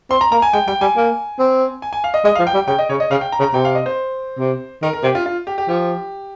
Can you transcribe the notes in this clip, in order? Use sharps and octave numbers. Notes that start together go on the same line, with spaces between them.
C4 C6
A#5
A#3 A#5
G#5
G#3 G5
G3 G5
G3 G#5
A#3
C4
G#5
G#5
F5
D#5
G#3 D#5
F3 F5
G5
G3
G5
C#3 G5
D#5
C#3 C#5
D#5
C#3 F5
G5
A#5
C#3
A#5
C3 G5
F5
D#5
C5
C3
D#3 A#4
A#4
C3 G4
F4
F4
G4
G4
F3 G4